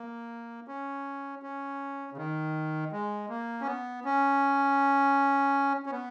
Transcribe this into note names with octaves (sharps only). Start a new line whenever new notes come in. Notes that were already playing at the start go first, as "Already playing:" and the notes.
Already playing: A#3
C#4
C#4
C#3
D#3
G#3
A#3
C#4
B3
C#4
C#4
B3